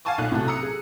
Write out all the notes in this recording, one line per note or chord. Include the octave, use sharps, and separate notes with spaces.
F5 F#5 G#5 A5 C#6 D6
B1 A#2 F#5 F#6
A2 C3 F#3 A4
A#5 D#6 E6 C#7
G#4